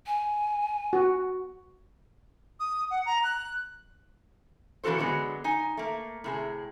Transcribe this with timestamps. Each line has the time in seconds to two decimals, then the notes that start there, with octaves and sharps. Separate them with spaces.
0.06 G#5
0.93 F#4
2.60 D#6
2.91 F#5
3.06 A#5
3.24 F#6
4.84 A#2 E3 B3 F#4 A4 C5
4.98 D3 F#3 G#3 B3
5.44 D#4 G#5
5.77 A3 A#3
6.24 A2 C3 G#4